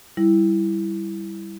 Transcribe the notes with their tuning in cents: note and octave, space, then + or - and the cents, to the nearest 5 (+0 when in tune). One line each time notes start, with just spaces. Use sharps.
G3 +0 E4 +0